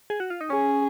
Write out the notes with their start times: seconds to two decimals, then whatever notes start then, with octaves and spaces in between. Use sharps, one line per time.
0.10 G#4
0.20 F#4
0.30 F4
0.41 D#4
0.50 C#4 G#4